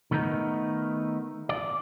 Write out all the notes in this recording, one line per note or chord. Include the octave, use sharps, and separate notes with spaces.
D#3 A3 B3 D#4 A#4
D5